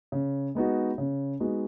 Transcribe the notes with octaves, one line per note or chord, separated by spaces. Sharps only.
C#3
G#3 B3 D#4 F#4
C#3
G#3 B3 D#4 F#4